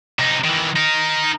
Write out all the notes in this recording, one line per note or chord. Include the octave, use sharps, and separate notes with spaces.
C3 D#4
D#3 E3
D#4 A#4